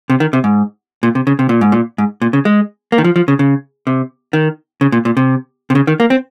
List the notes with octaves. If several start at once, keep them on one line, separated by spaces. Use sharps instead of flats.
C3
D#3
C3
G#2
A#2
C3
C#3
C3
A#2
G#2
A#2
G#2
A#2
C#3
G#3
A#3
D#3
F3
F3
C#3
C#3
C3
D#3
C#3
A#2
A#2
C3
C3
C#3
D#3
A#3
C4